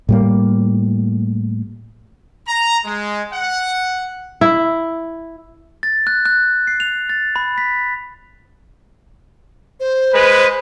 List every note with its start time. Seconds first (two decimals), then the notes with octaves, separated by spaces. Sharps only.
0.09 A2 G3 A#3
2.48 A#5
2.85 G#3
3.32 F#5
4.41 E4
5.83 A6
6.07 F#6
6.26 F#6
6.67 C7
6.80 F7
7.09 A6
7.36 B5
7.58 B6
9.80 C5
10.13 G#3 B4